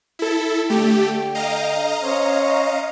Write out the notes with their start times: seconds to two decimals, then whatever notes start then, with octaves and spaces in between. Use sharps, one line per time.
0.19 E4 A4
0.70 D3 A3 G4 G5
1.35 D#5 F5 A#5
2.03 C#4 C5 C#5